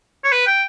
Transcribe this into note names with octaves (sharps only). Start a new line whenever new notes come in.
C#5
B4
G5